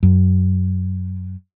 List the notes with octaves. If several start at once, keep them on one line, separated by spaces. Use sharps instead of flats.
F#2